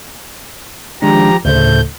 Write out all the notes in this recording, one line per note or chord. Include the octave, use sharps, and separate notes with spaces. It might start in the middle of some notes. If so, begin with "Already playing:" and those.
D#3 F3 G#3 D4 G4 A#5
D2 A2 C#3 A3 C5 G6